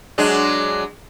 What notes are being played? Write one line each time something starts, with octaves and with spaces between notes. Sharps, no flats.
F#3 G#3 D4